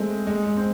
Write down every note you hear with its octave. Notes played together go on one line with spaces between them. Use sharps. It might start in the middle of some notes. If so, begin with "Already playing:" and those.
Already playing: G#3 A3 C4
G#3
G#3
C4